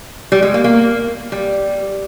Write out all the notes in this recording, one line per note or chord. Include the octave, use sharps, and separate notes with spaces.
G3
G#3
A#3
A#3
G3